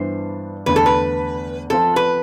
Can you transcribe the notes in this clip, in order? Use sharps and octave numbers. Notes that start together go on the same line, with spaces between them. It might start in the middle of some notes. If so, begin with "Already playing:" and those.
Already playing: G2 E3 B3 D4 C5
E2 D3 A3 B4
A4
B4
F3 C4 F4 A4
B4